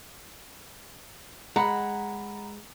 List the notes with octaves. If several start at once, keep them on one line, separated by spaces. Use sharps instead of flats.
G#3 F#5 A#5 B5